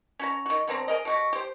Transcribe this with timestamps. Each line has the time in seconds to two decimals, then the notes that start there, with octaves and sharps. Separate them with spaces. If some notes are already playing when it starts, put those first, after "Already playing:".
0.19 C#4 F#4 A#5
0.46 D#3 F#4
0.68 D3 B3 C4 A#5
0.88 G#4 A#4 D#5
1.05 B2 F#4 G4
1.33 G4 C5